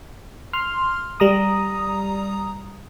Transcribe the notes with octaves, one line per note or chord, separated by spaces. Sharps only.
C6 F6
G3 A#5 D#6